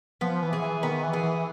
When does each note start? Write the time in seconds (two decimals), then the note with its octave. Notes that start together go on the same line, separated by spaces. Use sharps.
0.21 F3 B3
0.43 E3
0.53 G#4
0.62 E3
0.83 D#3 B3
1.03 E3
1.13 G#4
1.23 E3